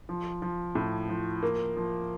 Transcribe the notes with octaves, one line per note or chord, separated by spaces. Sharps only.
F3
F3
A2
F3
A#3
F3